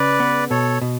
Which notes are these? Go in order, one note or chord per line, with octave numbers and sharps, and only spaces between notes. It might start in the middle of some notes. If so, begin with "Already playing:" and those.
Already playing: C#3 B4 D5
B3
B2 A4 C#5
B2